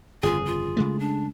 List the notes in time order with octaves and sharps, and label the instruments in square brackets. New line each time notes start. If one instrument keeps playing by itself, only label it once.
[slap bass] G1 F2 C#3 [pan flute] F4 [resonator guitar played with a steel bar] G#4
[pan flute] F4
[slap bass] C#3 G#3 A3
[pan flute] D4